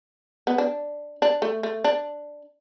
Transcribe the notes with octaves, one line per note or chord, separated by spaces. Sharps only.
B3
D4
D4
A3
A3
D4